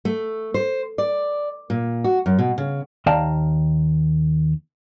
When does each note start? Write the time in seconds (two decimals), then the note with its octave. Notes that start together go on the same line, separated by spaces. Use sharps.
0.05 A3
0.54 C5
0.98 D5
1.70 A#2
2.04 F#4
2.26 F#2
2.39 B2
2.58 C#3
3.06 D#2 D5 F5 G5 A5 A#5